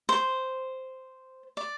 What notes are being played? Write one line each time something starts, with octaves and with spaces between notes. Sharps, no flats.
C5
D5